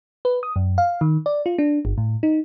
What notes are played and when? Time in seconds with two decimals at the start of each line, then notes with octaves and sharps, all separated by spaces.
0.25 B4
0.43 D#6
0.56 F#2
0.78 F5
1.01 D#3
1.26 D5
1.46 F4
1.58 D4
1.85 G1
1.98 A2
2.23 D#4